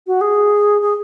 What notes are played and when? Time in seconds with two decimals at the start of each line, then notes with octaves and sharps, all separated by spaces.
0.07 F#4
0.21 G#4
0.82 G#4